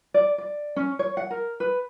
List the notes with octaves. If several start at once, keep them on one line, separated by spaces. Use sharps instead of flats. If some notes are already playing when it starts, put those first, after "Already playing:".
D5
D5
C#4
C#5
F#5
A#4
B4